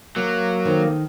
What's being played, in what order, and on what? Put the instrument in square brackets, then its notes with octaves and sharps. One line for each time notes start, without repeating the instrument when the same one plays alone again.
[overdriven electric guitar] F#3 [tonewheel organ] A#3
[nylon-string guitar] D#3 A4 C5